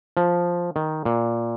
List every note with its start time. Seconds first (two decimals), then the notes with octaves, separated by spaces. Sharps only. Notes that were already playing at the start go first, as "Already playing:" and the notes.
0.17 F3
0.76 D#3
1.05 A#2